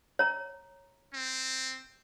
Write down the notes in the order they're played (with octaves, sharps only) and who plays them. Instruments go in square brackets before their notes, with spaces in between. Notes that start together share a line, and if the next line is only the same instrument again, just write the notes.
[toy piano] C#5 A#5
[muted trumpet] C4